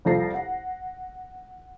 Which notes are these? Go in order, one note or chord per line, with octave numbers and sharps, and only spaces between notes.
C2 F2 F3 A4 A#6 C7
F#5